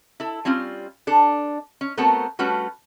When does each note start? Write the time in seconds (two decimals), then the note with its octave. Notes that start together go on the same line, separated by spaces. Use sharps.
0.20 E4 A4
0.45 G3 C4 C#4 F4
1.07 D4 A4
1.81 C#4
1.97 A3 B3 C4 F#4 A4 A#4
2.39 G3 A3 C#4 F#4 B4